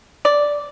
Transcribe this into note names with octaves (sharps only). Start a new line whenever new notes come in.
D5